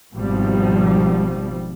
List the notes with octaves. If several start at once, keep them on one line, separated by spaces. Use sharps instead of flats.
G#1 B2 F3 G3